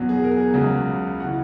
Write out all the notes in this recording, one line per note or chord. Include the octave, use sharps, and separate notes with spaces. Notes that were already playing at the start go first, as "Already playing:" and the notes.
Already playing: E2 B2 F#3
G#4
A#4
G#4
C#2 C#3 F#3
F#4
E3